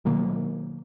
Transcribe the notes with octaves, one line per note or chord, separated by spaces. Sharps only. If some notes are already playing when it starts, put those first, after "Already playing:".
B2 D#3 F#3 A#3